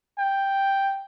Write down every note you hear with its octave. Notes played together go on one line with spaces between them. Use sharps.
G5